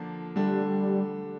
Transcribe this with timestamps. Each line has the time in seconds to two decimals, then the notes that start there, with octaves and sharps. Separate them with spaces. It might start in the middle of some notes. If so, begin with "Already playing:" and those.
Already playing: D3 F3 A#3 D4
0.36 D3 G3 A3 D4